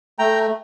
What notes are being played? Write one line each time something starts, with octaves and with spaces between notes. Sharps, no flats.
A3 G5 A#5